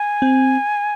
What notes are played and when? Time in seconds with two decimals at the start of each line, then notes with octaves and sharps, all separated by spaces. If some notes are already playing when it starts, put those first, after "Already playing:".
Already playing: G#5
0.22 C4